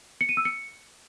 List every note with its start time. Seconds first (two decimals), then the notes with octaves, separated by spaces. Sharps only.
0.21 C#7
0.29 D#7
0.37 E6
0.45 C#7